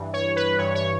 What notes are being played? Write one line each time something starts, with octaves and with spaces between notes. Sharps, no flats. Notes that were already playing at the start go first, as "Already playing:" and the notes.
Already playing: G2 E3
C#5
B4
G2 E3 C#5
C#5